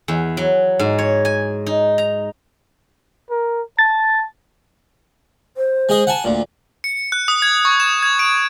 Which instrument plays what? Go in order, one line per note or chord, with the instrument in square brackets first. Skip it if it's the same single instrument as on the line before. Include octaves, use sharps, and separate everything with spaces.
[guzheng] E2
F#3
G#2
C#5
G#5
D#4
A#5
[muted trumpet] A#4
[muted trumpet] A5 [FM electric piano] A6
[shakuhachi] C5
[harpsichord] G#3 G#4 D#5
F#5 G#5 A5
[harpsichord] D2 A#2 [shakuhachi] D5
[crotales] C#7
F#6
D#6
G#6
C#6
E7
G#6
D7